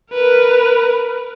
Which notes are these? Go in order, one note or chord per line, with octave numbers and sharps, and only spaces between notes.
A#4 B4